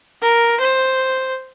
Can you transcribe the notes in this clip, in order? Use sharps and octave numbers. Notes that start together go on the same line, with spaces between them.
A#4
C5